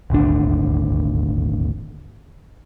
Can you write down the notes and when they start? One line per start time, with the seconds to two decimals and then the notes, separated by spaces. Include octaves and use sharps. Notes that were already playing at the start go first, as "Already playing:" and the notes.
0.10 D#1 G#1 D2 D4